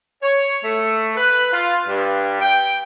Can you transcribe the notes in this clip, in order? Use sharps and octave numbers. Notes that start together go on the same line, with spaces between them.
C#5
A3
B4
F4
G2
G5